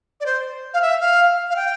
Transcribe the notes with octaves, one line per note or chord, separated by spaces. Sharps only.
D5
C5
F5
E5
F5
F5
G5